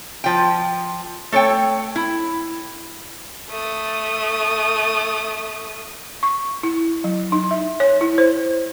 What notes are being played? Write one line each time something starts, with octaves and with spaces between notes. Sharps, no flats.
F3 G5
A3 A4 C#5 G5
E4
A3 D#6
C#6
E4
F#3
D#4
E5
C#5
E4
C5